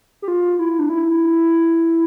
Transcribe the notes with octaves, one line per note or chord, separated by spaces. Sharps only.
G4
F4
E4
D4
E4